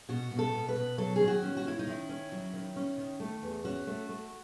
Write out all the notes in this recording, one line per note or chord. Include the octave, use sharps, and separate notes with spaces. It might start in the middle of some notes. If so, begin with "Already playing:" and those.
B2 F#4
B2
A4
B2
B4
B2
F#3 A4
D#3 G#4
F#4
C#4
F#4
C#4 E4
D#4
D#3 E4
C#4
F#3
D#3
C#4
D#3
A3
E2
C#4 F#4
A3
A3